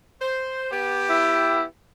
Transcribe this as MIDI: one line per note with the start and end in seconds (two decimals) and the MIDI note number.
0.22 0.67 72
0.72 1.63 59
0.72 1.63 67
1.09 1.63 64